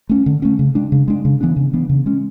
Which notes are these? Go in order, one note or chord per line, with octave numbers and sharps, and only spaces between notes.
A3 C#4
D3
A3 C#4
C#3
G#3 D4
C#3
G#3 D4
C#3
E3 B3 D4
C#3
E3 B3 D4
C#3
G#3 C#4